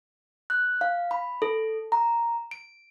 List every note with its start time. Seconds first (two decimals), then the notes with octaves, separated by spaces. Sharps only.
0.50 F#6
0.81 F5
1.11 B5
1.42 A4
1.92 A#5
2.51 D7